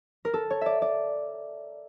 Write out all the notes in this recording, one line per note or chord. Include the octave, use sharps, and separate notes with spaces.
A#4
A4
C#5
D5 E5
D5